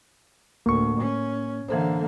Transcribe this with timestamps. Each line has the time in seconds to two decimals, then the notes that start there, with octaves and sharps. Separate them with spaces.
0.66 D2 A2 A#3 C#6
1.00 C#4
1.69 D3 E3 A#3 A4 C5